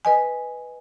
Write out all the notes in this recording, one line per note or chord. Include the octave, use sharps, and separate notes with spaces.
B4 D#5 G#5